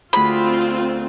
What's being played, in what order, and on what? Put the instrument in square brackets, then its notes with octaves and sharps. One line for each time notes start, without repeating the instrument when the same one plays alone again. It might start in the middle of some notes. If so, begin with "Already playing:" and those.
[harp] D2 G#4 [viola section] C4 F4 [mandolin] B5